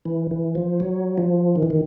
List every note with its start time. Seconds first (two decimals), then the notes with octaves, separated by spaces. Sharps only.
0.05 E3
0.31 E3
0.55 F3
0.80 F#3
1.18 F3
1.56 D#3
1.62 E3
1.70 D#3